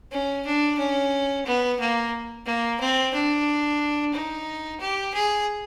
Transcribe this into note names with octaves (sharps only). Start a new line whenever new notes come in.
C#4
D4
C#4
B3
A#3
A#3
C4
D4
D#4
G4
G#4